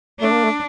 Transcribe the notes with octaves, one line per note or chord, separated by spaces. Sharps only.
A3 D4
A#3
A3